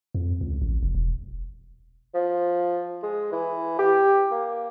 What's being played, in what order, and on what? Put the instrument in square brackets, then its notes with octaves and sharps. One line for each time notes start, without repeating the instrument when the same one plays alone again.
[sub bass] F2
C#2
A1
F1
E1
[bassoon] F3
G#3
E3
G4
A#3